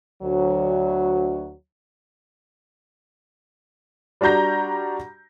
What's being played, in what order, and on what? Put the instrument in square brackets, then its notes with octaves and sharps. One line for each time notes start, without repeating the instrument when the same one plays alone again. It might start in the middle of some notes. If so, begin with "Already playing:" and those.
[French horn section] D2 F#3
[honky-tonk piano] G3 D4 F#4 A#5 G6 A#6